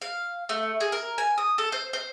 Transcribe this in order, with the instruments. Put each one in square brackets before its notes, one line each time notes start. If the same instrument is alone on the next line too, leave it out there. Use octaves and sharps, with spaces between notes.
[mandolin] F5
A3
G#4
A#4
G#5
D#6
A4
C5
C5